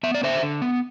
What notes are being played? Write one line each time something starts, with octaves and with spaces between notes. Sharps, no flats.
B3 E5
D5
D3 C5 E5
D3
B3